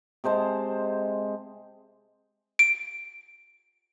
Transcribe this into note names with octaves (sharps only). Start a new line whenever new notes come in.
C3 G#3 C5 A5
D7